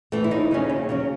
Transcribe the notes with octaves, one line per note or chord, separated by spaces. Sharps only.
E3 A3
E4
D#2 D#4
C#3 F#3 C#4
D#2
C#3 F#3 C#4